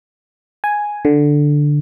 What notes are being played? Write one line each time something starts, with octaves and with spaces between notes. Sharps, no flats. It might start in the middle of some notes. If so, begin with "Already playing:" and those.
G#5
D3